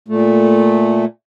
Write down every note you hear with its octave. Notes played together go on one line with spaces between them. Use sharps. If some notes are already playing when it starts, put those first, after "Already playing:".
A#2 A3